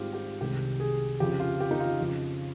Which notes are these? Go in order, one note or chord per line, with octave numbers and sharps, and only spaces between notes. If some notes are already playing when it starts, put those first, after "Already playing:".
Already playing: G#2 G3 C4 F4 G4
G4
C2 C3 D#3 G#3 G4
G#4
F2 C#3 F3 C4 G4
F4
G4
D#4
F4
F2 C#3 F3